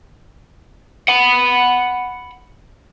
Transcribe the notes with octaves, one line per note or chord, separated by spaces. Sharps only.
F#5 B5